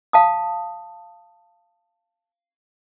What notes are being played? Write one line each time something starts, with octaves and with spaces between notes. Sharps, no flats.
F5 A5 D#6